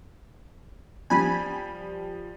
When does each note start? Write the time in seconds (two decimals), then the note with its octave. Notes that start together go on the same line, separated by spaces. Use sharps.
1.10 F3 G3 G#5 B5